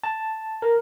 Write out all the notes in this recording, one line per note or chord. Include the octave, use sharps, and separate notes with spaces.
A5
A#4